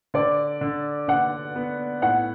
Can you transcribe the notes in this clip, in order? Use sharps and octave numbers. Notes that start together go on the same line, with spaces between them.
D3 D5
D3
D3 F#5
B3
A2 F#5